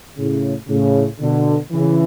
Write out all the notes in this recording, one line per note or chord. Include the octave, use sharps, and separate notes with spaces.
A2 C#3
A2 C#3
B2 D3
C#3 E3